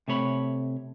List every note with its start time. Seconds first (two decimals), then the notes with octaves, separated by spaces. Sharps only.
0.08 C3 A3 C#5 B5